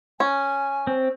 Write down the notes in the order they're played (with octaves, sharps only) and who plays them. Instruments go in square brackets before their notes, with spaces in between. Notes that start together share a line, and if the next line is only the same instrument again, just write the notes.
[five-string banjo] C#4 [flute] G#5
[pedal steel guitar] C4